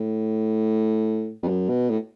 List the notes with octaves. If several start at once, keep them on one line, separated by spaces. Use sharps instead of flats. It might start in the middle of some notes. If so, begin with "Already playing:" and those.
Already playing: A2
F2
F#2
B2
A2